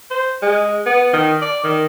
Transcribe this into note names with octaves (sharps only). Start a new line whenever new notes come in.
C5
G#3
B3
D#3
D5
D#3